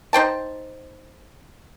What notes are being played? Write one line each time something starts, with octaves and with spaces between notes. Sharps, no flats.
D#4 C5 G5 A5